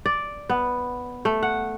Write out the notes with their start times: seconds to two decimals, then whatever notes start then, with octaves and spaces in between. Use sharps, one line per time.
0.06 D5
0.50 B3
1.25 A3
1.43 F#5